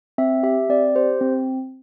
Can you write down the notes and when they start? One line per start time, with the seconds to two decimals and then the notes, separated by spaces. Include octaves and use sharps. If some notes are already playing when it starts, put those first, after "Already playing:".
0.18 C4 E5
0.43 G4 E5
0.69 C4 D5
0.95 G4 C5
1.21 C4